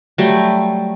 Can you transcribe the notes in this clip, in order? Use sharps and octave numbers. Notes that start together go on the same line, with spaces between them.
F#3 G3 A3